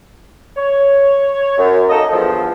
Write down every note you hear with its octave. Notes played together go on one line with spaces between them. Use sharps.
C#5
F#2
A#3 D#4 A4 D#5
E2 G2 F3